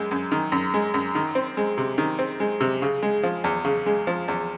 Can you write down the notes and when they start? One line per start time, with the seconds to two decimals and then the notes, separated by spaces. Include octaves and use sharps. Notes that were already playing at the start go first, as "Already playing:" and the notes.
Already playing: F#2 G#3
0.11 F#2
0.32 D#3
0.52 F#2
0.74 G#3
0.94 F#2
1.15 D#3
1.35 C4
1.57 G#3
1.78 C3
1.98 D#3
2.19 C4
2.40 G#3
2.61 C3
2.82 C#3
3.03 G#3
3.23 F3
3.44 E2
3.65 C#3
3.86 G#3
4.07 F3
4.28 E2